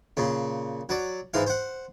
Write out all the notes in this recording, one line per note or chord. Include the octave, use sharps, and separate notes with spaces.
A#2 C#3
F#3 D5
G#2 E3 F5
C5 F#5